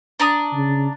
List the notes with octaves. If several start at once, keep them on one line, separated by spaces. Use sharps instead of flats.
D4 A#5 D#6
C#3